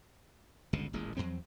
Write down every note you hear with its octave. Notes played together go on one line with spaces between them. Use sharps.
G1 C#2 B2 D3
D#1 A1 A#2 G#3
E2 G2 F#3 C4